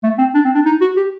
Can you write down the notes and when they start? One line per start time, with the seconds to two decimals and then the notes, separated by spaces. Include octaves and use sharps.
0.03 A3
0.18 C4
0.34 D4
0.45 C4
0.55 D4
0.66 D#4
0.81 F#4
0.97 G4